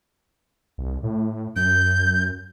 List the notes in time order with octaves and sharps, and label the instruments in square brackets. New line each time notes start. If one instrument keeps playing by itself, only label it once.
[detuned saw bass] C2
A2
[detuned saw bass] F#2 [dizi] G6